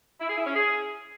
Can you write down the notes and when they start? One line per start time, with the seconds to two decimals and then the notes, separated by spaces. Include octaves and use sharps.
0.21 E4
0.29 G#4
0.38 E4
0.47 C#4
0.56 G#4